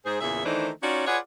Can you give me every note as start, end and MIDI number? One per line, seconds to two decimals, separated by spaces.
0.06 0.19 44
0.06 0.19 68
0.06 0.19 72
0.21 0.44 40
0.21 0.44 46
0.21 0.44 49
0.21 0.44 68
0.21 0.44 76
0.45 0.70 51
0.45 0.70 52
0.45 0.70 57
0.45 0.70 62
0.45 0.70 63
0.45 0.70 72
0.82 1.05 61
0.82 1.05 63
0.82 1.05 65
0.82 1.05 66
0.82 1.05 73
0.82 1.05 74
1.07 1.18 65
1.07 1.18 68
1.07 1.18 71
1.07 1.18 73
1.07 1.18 74
1.07 1.18 78